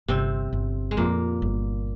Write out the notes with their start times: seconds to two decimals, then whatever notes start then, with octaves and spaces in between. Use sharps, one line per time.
0.08 G1 C3 C4
0.53 G1
0.91 G#3
0.97 F2 A#2 A#3
1.42 G1